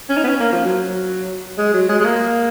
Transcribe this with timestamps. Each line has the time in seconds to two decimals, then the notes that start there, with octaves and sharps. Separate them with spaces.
0.09 C#4
0.17 D#4
0.24 B3
0.28 C#4
0.40 A#3
0.52 F3
0.64 F#3
1.58 G#3
1.74 F#3
1.89 G#3
2.00 G#3
2.05 A#3